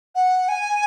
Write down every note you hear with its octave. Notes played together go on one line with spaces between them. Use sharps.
F#5
G#5